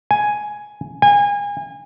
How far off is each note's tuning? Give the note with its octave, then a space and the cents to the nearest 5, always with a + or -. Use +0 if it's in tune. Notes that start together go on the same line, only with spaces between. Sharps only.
G#5 +5
G#5 -30